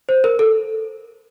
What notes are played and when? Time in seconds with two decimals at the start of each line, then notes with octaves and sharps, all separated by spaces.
0.09 C5
0.24 A#4
0.39 A4